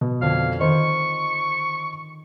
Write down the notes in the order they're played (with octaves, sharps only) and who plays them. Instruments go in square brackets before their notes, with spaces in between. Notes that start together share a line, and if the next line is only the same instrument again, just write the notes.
[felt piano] B2
[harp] F2 D3 G#6 [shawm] F5
[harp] D#3 [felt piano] C5 D#5 [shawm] C#6